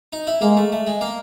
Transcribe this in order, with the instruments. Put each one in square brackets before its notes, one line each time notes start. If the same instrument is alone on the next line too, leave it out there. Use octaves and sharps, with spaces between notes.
[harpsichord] D#4
E4
[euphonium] G#3 [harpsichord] A#3
[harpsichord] A3
A3
G#3
A#3